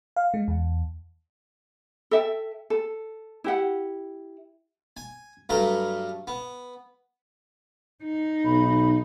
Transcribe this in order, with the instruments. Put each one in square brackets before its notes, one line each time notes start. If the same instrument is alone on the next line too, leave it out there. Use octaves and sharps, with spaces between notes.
[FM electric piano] F5
G#3
E2
[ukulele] A4 E5 G5
A4
E4 G4 F#5
[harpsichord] G#5
G2 F#3 A3 A#4
B3
[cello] D#4
[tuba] B1 [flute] B5